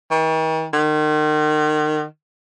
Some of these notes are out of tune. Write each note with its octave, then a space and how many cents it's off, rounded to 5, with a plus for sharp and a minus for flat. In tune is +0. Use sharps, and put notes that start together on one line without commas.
D#3 +45
D#3 -35